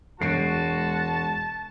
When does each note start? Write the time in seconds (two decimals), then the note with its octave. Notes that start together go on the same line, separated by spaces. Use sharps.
0.20 E1 G#3 F#4 A5 C7 D7